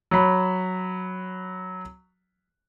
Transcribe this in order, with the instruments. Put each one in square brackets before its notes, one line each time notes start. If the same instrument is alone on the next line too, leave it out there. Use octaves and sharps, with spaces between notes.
[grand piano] F#3 B5